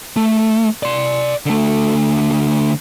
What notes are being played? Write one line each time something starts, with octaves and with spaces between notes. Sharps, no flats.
A3
D5 C6
D3 A3